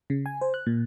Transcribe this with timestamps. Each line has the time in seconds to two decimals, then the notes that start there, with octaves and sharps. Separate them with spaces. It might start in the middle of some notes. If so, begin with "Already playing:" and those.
0.10 C#3
0.26 G#5
0.41 C5
0.54 F#6
0.67 A#2